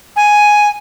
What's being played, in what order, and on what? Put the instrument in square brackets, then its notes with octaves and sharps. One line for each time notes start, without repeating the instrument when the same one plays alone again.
[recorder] G#5